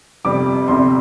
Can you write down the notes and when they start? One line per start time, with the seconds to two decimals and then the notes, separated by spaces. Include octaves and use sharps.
0.24 G1 F2 C3 G3 D6
0.68 G1 F2 C3 G3 C6